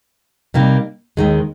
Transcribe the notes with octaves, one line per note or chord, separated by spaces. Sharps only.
C3 G3 A#3 D#4
D#2 D#3 G#3